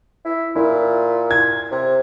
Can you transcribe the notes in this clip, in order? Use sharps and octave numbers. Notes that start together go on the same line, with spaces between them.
E4
A#2 E4
G#6
C3